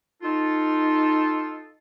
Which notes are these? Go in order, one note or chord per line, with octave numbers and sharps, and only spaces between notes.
D#4 F4 A4